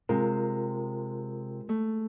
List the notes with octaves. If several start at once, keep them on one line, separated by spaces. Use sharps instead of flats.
C3 G#3 F4 A#4
A3